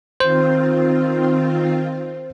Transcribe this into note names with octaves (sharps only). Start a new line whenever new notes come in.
D#3 C4 F4 C5